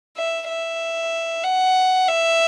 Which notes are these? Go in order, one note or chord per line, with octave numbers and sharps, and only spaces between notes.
E5
E5
F#5
E5